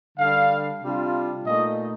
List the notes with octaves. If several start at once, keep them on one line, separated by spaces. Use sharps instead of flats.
D3 G3 D4 F5
C3 G3 D4 F4
A#2 A3 D#4 D#5